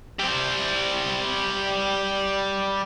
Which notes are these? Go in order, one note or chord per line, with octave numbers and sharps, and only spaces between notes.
G3 C5